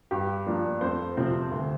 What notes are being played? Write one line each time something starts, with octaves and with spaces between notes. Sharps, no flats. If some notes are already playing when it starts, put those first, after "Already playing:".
G2 G4
F3 A#3 D4
F2 C5
C3 F3 C4
D2